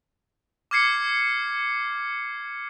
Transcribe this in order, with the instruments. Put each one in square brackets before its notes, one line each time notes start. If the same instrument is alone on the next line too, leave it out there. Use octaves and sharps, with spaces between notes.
[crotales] D6 F6 G#6 C7 C#7